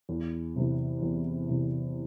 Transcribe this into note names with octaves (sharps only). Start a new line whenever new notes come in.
E2
C3 E3
E2
C3 E3